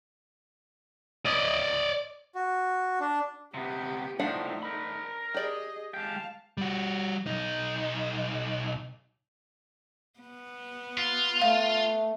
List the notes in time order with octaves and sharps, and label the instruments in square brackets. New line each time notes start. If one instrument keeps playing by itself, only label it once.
[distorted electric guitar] D5 D#5
[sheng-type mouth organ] F#4
D4
[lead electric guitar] C3 B3 [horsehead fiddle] G4
[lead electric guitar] A2 F3 [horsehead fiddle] A3 D#4 [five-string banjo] D4 F5 F#5
[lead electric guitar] A#4 B5
[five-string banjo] G4 D5 [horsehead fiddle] G#4 D#5
[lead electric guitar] G#3 G5 [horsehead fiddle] F5 A5
[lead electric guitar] G3 F#4
B1 D#4
[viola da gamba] B3
[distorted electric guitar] F4
[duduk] A3 [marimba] F5